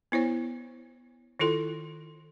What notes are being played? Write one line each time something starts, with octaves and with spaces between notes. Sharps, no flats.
B3 E4 C5 C#5
D#3 E4 F4 A4 C6